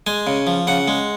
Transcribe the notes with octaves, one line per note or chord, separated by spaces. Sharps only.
G#3 G#5
C#3
F3
C#3 F#5
G#3